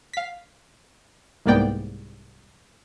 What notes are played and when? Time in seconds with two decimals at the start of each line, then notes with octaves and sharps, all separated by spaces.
0.13 F5 B6
1.46 C2 G#2 A#3 B3 D5 G5